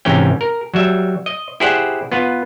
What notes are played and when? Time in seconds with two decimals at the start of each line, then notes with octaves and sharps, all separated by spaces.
0.05 G#2 C3 E3 C#4 G5
0.41 A#4
0.74 F#3 G3 E5
1.26 D#5
1.60 E4 G4 G#4 C5 D5 F#5
2.12 B3 F4 B4